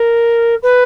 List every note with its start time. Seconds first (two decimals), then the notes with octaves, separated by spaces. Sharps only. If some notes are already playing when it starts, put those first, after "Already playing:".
Already playing: A#4
0.63 B4